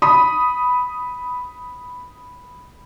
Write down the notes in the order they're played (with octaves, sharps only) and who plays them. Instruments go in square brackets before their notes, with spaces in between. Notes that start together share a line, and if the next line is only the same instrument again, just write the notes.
[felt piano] B5 D#6